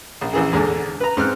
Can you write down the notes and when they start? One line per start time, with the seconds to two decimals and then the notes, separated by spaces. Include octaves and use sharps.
0.21 A#1
0.33 A#1 E3 G#4
0.52 E2 G#2 D3 G#3
1.00 B4 A#5
1.17 G#2 C4 F6 F#6